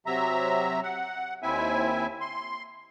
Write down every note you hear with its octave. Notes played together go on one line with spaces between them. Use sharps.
C3 F#3 E5 A#5
F#5
D#2 C4 E4 E5 G#5
C6